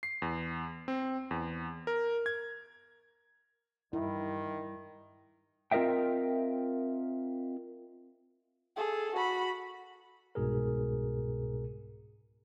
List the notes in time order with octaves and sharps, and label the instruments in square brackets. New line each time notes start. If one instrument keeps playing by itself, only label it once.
[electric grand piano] C7
E2
C4
E2
A#4
G#6
[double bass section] G2 G3 [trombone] D#3 [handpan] E4
[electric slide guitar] C4 F4 A#4 D#5 E5 G5
[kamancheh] G#4 A4
F#4 B5
[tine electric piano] C2 G#2 B2 G#4 A#4